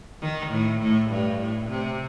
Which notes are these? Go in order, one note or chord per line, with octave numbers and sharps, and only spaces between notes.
D#3
A2
A2
G2
A2
C3